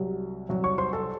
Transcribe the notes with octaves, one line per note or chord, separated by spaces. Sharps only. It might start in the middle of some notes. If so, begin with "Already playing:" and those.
Already playing: C2 C3 F#3
C2 C3 F#3
C#5 C#6
C5 C6
A4 A5